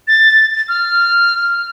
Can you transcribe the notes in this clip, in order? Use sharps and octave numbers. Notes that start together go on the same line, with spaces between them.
A6
F6